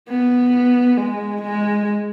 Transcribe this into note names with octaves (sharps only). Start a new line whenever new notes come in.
B3
G#3
G#3